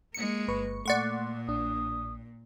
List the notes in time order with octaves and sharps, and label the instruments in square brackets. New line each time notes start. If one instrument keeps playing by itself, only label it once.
[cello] G#3 A#3 [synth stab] C#7
[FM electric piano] G1 B4 C#6
[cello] A#2 [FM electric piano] A3 C6 [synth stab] D5 F#5 C#6
[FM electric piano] A#1 D4 [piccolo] D#6